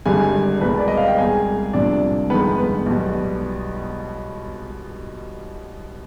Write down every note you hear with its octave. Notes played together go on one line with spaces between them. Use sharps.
G#1 G2 D3 G3 G#4 G#5
C2 B2 G#3 B4 B5
D5
D#5
F5
G5
C2 B2 G#3 G#4 G#5
C2 C3 F3 D4 D5
G1 F2 D#3 G#3 B3 B4
B3 B4
B1 B2 G3